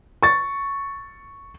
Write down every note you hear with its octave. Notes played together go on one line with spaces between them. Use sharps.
C#6 A6